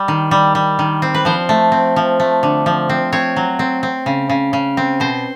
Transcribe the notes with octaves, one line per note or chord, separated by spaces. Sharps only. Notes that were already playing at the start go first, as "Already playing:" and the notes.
Already playing: G3
D#3
G3
G3
D#3
C4
B4
F3 C5
A3
C4
F3
A3
D3
F3
C4
C4 C#5
F#3
C4
C4
C#3
C#3
C#3
C4
B2 C5